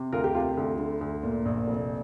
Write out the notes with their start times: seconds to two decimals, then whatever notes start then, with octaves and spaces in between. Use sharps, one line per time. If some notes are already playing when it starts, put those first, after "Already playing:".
Already playing: C3
0.12 D2 F4 A#4
0.24 G4
0.35 C3 F4
0.57 D2
0.79 D3
1.01 D2
1.23 A#2
1.46 A#1
1.68 F1